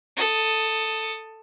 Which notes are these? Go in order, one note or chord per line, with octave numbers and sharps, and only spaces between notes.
A4 D#6